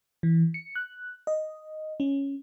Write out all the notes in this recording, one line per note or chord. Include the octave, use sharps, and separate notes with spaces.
E3
C#7
F#6
D#5
C#4